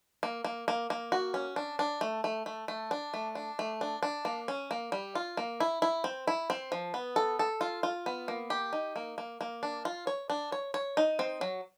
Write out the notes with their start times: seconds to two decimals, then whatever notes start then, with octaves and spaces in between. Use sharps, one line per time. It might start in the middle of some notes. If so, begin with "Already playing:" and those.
0.23 A#3
0.44 A#3
0.68 A#3
0.90 A#3
1.12 F#4
1.34 C#4
1.56 D4
1.79 D4
2.01 A3
2.24 A3
2.46 A3
2.68 A3
2.91 D4
3.14 A3
3.35 D4
3.59 A3
3.81 D4
4.03 D4
4.25 A#3
4.48 C#4
4.71 A#3
4.92 G3
5.15 F4
5.37 A#3
5.60 E4
5.82 E4
6.04 C4
6.27 E4
6.50 C4
6.72 F3
6.94 B3
7.16 A4
7.39 A4
7.61 F4
7.83 F4
8.06 B3
8.28 A#3
8.50 G4
8.73 D#4
8.96 A#3
9.18 A#3
9.41 A#3
9.63 D4
9.85 F4
10.07 C#5
10.30 D4
10.52 C#5
10.74 C#5
10.97 D#4
11.19 C4
11.41 F#3